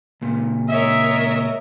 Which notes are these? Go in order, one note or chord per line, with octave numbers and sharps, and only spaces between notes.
C#2 A#2
A#4 C#5 D#5 E5